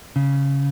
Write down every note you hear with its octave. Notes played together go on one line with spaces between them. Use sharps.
C#3